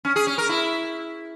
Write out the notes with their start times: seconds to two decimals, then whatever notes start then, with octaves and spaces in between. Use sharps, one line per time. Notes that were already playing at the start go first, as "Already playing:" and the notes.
0.05 C#4
0.16 G#4
0.27 C#4
0.38 A#4
0.49 E4